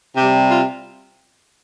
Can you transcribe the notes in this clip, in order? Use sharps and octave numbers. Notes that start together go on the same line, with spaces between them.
C3 G3 G4
F4